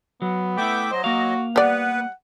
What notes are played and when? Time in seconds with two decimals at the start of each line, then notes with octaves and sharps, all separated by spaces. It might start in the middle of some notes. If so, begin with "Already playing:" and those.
0.22 F#3 B3
0.57 A3 E4 E5 G5 D6
0.92 F#3 C5 D#5
1.04 A#3 F#4 F5
1.56 G3 B3 B4 D5 F#5